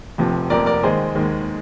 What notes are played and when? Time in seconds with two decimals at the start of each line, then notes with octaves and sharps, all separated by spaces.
0.18 F1 F2 C3 F3
0.50 F1 F2 C3 F3 A#4 D5
0.66 A#4 D5
0.83 D#2 D#3 G#3 G#4 C5
1.15 D#2 D#3 G#3